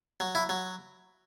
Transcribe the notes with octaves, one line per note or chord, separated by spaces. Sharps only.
F#3
E4
F#3